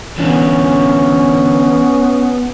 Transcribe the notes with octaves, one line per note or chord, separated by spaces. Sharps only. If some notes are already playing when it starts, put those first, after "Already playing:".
D3 E3 B3 C#4